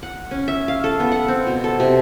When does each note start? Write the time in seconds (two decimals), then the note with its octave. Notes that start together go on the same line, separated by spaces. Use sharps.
0.03 F#5
0.31 C#4
0.48 E5
0.68 F5
0.84 A4
1.00 B3
1.12 F#5
1.28 C4
1.47 B2
1.64 A4
1.80 C3